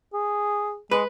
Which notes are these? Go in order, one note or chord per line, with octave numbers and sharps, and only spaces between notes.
G#4
G#3 B4